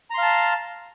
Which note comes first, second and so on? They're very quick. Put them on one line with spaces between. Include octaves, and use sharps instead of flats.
A#5 C6 F5 A5